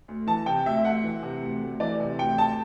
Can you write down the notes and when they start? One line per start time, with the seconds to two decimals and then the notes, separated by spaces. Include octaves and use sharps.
0.08 D2
0.27 E3 A5
0.46 C3 G5
0.66 D2 E5
0.84 D2 F#5
1.04 E3
1.23 C3
1.42 D2
1.62 D2
1.80 E3 D5
2.00 C3
2.19 D2 G5
2.38 D2 A5